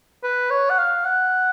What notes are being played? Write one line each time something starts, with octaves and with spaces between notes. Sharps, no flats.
B4
C#5
F#5
F5
F#5